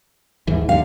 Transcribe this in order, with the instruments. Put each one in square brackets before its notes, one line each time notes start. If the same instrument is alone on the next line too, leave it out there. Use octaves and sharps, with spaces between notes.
[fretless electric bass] D#2 G#2 E3
[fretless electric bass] D#2 D3 [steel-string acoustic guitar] F5